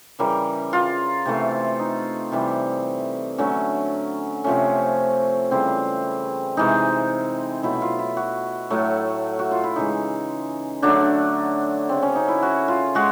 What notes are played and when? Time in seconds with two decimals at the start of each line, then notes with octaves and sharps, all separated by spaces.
0.19 C#3 E3 G3 A#4
0.73 F4
1.25 C3 E3 A3
1.79 D#4
2.32 C3 E3 G3
3.38 D3 F#3 A3 C#4
4.44 C3 F3 A3 C#4
5.51 C#3 E3 G3 C4
6.57 C3 E3 G#3 D#4
7.63 B2 F#3 A3 E4
7.82 F4
7.99 E4
8.17 F#4
8.70 A2 F#3 A3
9.39 F#4
9.51 F4
9.64 E4
9.76 C#3 E3 G#3 D#4
10.82 D3 F#3 A3 D4
11.89 C#3 F#3 A3 C4
12.02 C#4
12.16 D#4
12.28 E4
12.42 F#4
12.68 F4
12.95 G#3 F#4